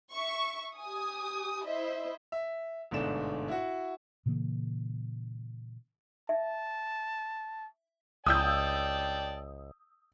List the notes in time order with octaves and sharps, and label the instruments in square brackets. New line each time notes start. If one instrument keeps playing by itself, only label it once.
[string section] E5 C#6
G4 G#5 D#6
E4 C5 D#5 E5
[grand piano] E5
G1 G#2 B2 A3 D4 E7
E4 F#4
[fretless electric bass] A#2 C#3 E3 A#3
[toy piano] E5 [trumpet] A5
[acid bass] C#2 [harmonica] D5 G5 A5 [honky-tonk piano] D#6 E6 G6